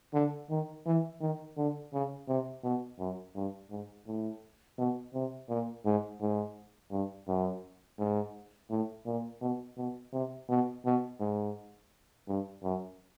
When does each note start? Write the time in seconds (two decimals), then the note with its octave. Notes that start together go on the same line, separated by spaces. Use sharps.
0.14 D3
0.50 D#3
0.86 E3
1.21 D#3
1.57 D3
1.93 C#3
2.28 C3
2.64 B2
2.99 F#2
3.36 G2
3.71 G#2
4.07 A2
4.79 B2
5.14 C3
5.49 A#2
5.86 G#2
6.21 G#2
6.92 G2
7.28 F#2
7.99 G#2
8.70 A2
9.06 A#2
9.42 B2
9.78 B2
10.13 C3
10.49 B2
10.85 B2
11.20 G#2
12.28 G2
12.63 F#2